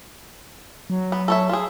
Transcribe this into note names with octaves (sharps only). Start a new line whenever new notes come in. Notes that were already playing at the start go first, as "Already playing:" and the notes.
F#3
B3
A4 C#5 E5
F4 G#4